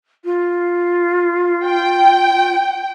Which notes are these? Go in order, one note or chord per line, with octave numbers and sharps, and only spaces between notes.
F4
G5